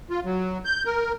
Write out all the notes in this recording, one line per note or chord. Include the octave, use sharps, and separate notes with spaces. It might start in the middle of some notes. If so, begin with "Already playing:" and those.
F4
F#3
G6
A#4